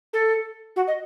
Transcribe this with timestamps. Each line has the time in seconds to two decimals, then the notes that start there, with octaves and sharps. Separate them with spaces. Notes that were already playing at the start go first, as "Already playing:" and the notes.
0.13 A4
0.76 F#4
0.87 D#5